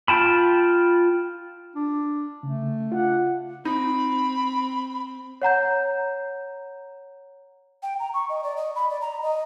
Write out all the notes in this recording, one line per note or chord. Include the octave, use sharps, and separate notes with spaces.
F4 G5 A5 B5
D4
C#3 A3
D4 F4 F#5
C4 D#4 B5
C#5 F#5 A#5 G6
G5
A#5
C#6
D#5
D5
D#5
B5
D5
A#5
D#5